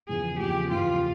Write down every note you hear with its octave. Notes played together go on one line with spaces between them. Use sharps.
E2 C#3 F3 G#4
E2 C#3 F3 G4
E2 C#3 F3 F4